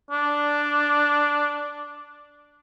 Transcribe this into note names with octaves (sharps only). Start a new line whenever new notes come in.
D4